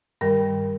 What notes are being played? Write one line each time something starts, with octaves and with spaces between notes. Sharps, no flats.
G2 D#3 G3 A#4